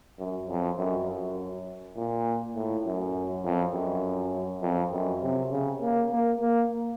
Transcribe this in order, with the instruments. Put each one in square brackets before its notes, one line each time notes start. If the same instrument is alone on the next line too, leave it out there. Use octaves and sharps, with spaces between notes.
[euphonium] F#2
F2
F#2
F#2
A#2
A2
F#2
F2
F#2
F2
F#2
C3
C#3
A#3
A#3
A#3